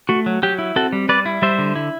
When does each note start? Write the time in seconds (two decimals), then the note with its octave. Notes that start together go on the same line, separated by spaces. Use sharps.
0.09 A3 F#4
0.26 F#3
0.43 F#3 G4
0.59 E4
0.76 C4 F#4 A4
0.93 G3
1.09 G3 B4 D5
1.26 E4
1.42 G3 C5 E5
1.59 D3
1.76 E4